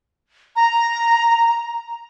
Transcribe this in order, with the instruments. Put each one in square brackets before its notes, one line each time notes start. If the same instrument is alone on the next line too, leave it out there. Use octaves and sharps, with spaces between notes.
[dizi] A#5